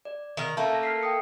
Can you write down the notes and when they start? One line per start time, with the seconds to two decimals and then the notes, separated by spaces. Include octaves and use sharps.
0.05 D5
0.37 D#3 A#4
0.57 A3 A#3 C#4 A5
0.71 A5 A#6
0.83 F6 B6 C7
1.01 G5 D#6 C#7